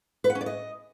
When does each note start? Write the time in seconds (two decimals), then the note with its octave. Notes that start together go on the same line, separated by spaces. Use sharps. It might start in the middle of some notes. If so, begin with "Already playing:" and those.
0.24 B4
0.30 F#5
0.35 C#4
0.41 D5
0.46 D#5